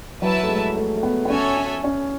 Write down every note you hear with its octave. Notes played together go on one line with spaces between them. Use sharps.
F#3 E4 B4 E5 A5
A3
G#3
A3
A3
B3
B3
C#4 F#4 A4 C#5 E5 G#5
C#4
C#4